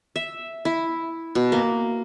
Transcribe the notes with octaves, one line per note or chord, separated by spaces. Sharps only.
E5
E4
B2
A#3